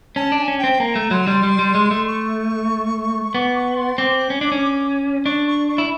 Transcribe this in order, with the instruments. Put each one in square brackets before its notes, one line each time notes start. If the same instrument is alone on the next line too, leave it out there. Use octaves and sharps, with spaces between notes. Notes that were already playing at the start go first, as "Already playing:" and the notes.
[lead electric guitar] C#4 [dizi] A5
[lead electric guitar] D4 [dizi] A5
[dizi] G#5
[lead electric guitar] C#4
[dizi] G5
[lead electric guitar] C4
[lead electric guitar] A#3 [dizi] A#5
[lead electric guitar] A3
[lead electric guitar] F#3 [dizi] C6
[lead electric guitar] G3
G3
G3
G#3
A3
[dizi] C#6
[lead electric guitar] B3 [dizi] D6
[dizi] C#6
C6
[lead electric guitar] C4 [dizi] D6
[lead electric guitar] C#4
D4
C#4
[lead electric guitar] D4 [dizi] C#6
[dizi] C#6
C#6
[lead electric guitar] E4